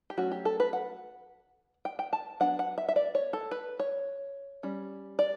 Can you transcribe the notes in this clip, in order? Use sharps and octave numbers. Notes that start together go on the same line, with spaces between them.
G4
F#3 A3 C#4 F#4
G4
A4
B4
F#5
G5
G5
A5
F#3 B3 D4 F#5
F#5
E5
E5
D5
C#5
A4
B4
C#5
G3 C#4
D5